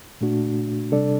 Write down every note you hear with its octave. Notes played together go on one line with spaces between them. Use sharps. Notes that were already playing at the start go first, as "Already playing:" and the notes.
A#2 A3 D4 F#4
C3 G3 D4 A4 D5